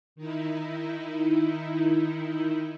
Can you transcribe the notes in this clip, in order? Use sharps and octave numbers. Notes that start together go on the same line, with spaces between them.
D#3 D#4 E4